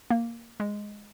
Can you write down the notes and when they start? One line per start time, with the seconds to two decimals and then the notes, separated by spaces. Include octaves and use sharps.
0.10 A#3
0.60 G#3